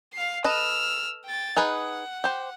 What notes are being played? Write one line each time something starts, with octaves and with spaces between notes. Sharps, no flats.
F5 C7
A4 B4 D#5 E6 F6
G5 A6
D#4 G#4 B4 F#5
G4 C5